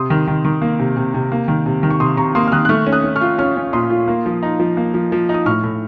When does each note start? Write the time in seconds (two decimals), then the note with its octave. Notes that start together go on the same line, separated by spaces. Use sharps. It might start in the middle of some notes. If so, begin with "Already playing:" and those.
Already playing: C3 C6 D#6
0.10 D#3
0.27 D#3
0.45 D#3
0.62 A#3
0.79 C3
0.97 C3
1.14 C3
1.32 A#3
1.48 D#3
1.66 C3
1.83 D#3
1.91 C#6
2.00 C3 C6 D#6
2.17 C3 A#5 C#6
2.35 A#3 C6 D#6
2.47 F6
2.52 D#3 D#6 F#6
2.65 F#6
2.69 A3 C#6 F6
2.87 C#4
2.92 D#6 F#6
3.04 C#4
3.16 C#6 F6
3.21 F4
3.39 C#4 C#6 F6
3.56 C#4
3.73 A#2 C6 D#6
3.90 F4
4.08 A#3
4.26 F3
4.43 D#4
4.60 F3
4.77 A#3
4.94 F3
5.12 F3
5.29 D#4
5.34 D#6
5.46 A2 C#6 F6
5.63 A2